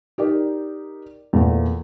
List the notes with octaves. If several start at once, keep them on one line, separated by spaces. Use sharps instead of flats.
D#4 G4 A#4 D5
E2 A#2 A3